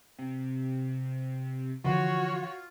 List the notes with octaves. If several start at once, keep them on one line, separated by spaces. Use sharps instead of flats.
C3
D3 E3 F3 F4 F#4 C#5